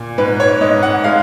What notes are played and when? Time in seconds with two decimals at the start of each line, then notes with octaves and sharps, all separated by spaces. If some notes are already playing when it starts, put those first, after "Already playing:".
Already playing: A#2
0.18 G#2 B4
0.40 C#5
0.61 G#2 D#5
0.83 F#5
1.04 G#3 F5